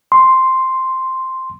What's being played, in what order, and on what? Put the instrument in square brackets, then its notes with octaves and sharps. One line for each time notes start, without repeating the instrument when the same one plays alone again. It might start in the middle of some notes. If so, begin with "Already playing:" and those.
[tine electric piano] C6